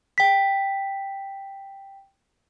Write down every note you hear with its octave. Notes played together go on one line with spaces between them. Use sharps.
G5 B6